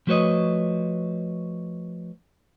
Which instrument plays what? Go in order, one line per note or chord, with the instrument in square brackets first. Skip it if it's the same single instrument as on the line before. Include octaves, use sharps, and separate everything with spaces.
[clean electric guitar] F3 A3 F#4 B4 C#5 D#5